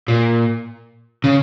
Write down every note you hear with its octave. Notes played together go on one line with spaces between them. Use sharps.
A#2
C#3